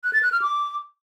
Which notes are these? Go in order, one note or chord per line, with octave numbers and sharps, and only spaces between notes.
F#6
A6
F#6
F6
D6